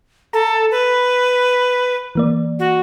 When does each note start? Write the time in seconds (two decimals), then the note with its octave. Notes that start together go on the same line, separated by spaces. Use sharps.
0.33 A4 A#5
0.71 B4
2.15 E3 A#3 D5
2.59 F#4